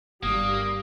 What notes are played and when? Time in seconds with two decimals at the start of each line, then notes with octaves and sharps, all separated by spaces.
0.23 G1 G3 A#3 D#6